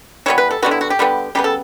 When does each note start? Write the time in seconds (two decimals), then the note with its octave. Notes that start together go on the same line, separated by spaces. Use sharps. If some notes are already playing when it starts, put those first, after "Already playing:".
0.26 E3 G3 B3 C#5
0.38 B4
0.51 A4
0.62 D3 G3 B3 F#4
0.71 E4
0.81 F#4
0.90 G4
0.99 D3 G3 B3
1.35 C#3 G3 B3 G4
1.44 A4